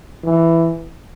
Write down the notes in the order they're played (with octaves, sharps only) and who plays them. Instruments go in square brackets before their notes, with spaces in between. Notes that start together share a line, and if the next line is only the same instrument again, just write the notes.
[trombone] E3